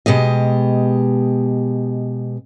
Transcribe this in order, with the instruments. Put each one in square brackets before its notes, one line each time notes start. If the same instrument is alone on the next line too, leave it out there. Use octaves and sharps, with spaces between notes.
[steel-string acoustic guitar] B2 G#3 G4 D#5